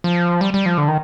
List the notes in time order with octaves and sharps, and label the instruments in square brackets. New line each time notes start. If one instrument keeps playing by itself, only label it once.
[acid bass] F3
G3
G3
F3
D3
D#3